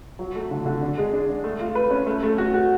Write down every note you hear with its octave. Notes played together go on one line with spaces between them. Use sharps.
F#3
A3
D3
D3
D4
G#3
D4
D4
A3
F4
B4
C#4
A3
A3
F#4
F#4